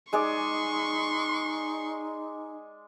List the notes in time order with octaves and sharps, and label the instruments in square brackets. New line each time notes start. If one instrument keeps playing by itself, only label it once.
[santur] G#3 G#4 D5 [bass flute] D#4 [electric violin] C6 C#6